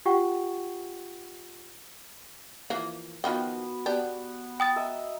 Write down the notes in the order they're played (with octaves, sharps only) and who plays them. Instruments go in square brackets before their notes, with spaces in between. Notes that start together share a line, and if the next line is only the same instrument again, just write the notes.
[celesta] F4 G4 F#5 G5 C#6
[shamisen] E3 F3 A#3
[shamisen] D#3 F3 G5 [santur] B3 F#4
[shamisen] B3 D4 G4 [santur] F#5
[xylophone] G5 D#6 A6
[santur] D#5 E5 A#5